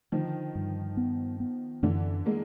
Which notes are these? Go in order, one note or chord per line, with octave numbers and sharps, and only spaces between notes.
D3 D#3 F3
G2
B3
B3
F#2 D3 E3
G#3 A#3